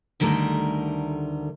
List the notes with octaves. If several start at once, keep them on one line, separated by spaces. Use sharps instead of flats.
D2 D3 D#3 G3 A3 A#4